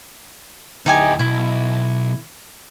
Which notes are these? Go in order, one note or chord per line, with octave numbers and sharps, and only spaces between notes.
D2 D#4 E4 G4 G#5
B1 E4